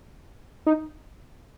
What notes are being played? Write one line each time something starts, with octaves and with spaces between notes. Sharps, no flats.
D#4